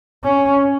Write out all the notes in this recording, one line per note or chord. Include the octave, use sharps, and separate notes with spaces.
C#4